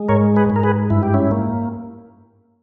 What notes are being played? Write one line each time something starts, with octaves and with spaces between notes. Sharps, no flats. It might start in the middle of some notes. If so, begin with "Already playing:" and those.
Already playing: G#3
G#2 A#4 C#5
G#4 B4
G#2
A#4
G#4 B4
G2 E4
G4
C#4 E4
A#3